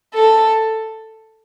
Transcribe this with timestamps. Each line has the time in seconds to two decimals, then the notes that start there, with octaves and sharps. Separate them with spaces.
0.14 A4